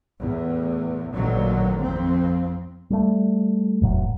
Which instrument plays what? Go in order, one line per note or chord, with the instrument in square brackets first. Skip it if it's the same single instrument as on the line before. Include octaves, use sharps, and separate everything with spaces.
[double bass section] E2 A2
A1 D#2 A#2 D3 D#3 F#3
F2 C4
[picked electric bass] G3 A3
E1 A2 F#3